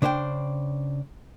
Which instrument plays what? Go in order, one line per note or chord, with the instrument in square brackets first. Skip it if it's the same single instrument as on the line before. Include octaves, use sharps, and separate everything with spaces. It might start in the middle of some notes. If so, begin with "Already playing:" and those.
[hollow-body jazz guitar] C#3 D4 C5 F5 G5